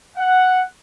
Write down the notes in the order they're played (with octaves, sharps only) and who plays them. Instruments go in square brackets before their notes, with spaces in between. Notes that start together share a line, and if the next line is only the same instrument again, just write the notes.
[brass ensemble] F#5